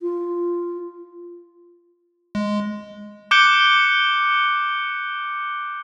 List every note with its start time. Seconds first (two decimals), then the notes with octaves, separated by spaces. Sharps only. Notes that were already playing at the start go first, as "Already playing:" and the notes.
0.02 F4
2.35 G#3
3.31 D6 F#6 G6 C#7 D7 G7